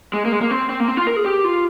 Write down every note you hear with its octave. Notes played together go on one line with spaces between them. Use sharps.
G#3
A#3
G#3
A#3
C4
C4
A#3
C4
F4
A#4
G#4
G4
F4